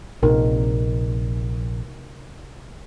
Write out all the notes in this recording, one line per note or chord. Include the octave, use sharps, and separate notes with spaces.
A#1 C3 D#4 A#4